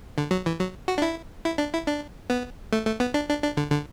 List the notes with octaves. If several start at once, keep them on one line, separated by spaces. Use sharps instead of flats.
D3
F#3
E3
F#3
F#4
D4
E4
E4
D4
E4
D4
B3
A3
A3
B3
D4
D4
D4
D3
D3